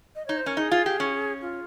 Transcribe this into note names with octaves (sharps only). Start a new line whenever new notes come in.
D#5
D#4 C#5
C5
C#4 A#4
D#4 G#4
F4
G4
C#4
F4